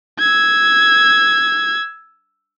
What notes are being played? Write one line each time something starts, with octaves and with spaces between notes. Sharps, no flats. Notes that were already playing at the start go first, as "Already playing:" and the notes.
E6 G#6